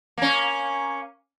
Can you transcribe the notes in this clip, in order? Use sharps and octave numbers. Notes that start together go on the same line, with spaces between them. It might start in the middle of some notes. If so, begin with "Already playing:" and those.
A#3 C#4